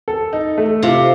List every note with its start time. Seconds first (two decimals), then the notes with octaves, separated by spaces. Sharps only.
0.08 A4
0.33 D#4
0.58 A3
0.82 C3 F4